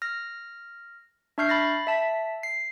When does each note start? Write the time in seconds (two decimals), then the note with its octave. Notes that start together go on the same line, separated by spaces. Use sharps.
0.02 F6 A#6
1.38 D4 E5 C#6 F6 G6 C7
1.49 B5 A6 A#6
1.87 E5 A5 B6
2.43 C7